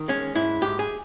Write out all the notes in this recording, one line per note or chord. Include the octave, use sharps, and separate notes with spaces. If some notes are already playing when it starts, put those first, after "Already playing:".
Already playing: D#3
G#3 C#4
G#2 E4
G#2 G4
G#4